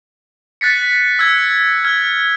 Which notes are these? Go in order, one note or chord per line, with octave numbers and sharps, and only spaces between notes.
F#6 A6 B6 C#7
E6 G#6
F6 G#6